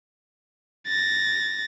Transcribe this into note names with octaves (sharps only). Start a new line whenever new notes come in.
A6 A#6